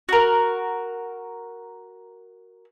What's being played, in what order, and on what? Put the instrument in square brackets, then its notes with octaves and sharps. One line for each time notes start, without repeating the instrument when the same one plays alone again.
[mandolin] F#4 A#4